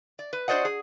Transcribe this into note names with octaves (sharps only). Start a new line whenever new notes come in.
D5
B4
D4 F#4 C5 D5 D#5 F#5
G#4